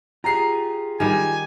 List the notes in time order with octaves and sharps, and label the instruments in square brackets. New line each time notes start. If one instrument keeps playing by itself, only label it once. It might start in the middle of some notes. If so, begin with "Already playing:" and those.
[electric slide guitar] F4 G4 G#4 [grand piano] A#5 C7
[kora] D#3 G3 [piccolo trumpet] G#5